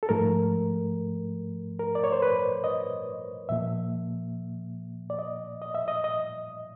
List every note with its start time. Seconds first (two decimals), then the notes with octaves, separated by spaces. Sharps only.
0.03 A4
0.09 G#2 F3 A3 A#4
1.79 A#4
1.95 D5
2.04 C#5
2.12 C5
2.22 B4
2.64 D#5
3.49 A#2 F3 A#3 E5
5.10 D5
5.19 D#5
5.62 D#5
5.74 E5
5.88 D#5
6.04 D#5